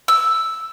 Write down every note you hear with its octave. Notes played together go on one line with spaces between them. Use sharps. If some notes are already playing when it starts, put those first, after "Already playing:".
E6